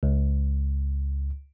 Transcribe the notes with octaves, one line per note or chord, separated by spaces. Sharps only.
C#2